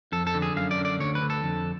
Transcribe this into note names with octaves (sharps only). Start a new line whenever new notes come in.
F2 A4
A4
D3
G#4
F#2 F5
D5
D3
D5
D2 C#5
B4
D3
A4
F2